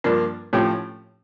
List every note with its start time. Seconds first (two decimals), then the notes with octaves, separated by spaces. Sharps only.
0.04 G2 F3 A#3 D4
0.53 A2 F3 C#4 G4